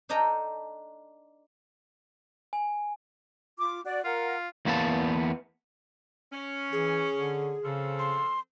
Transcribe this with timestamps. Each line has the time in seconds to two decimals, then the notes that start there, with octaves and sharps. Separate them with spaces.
0.09 D4 D#4 A4 D#5 G5 A#5
2.53 G#5
3.59 F4 D6
3.85 F#4 D5
4.05 F4 A#4 F#5
4.65 E2 A#3 B3 B4 A5
6.31 C#4
6.72 E3 G#4
7.13 D3
7.64 C#3 F3 C4 A4
7.99 C6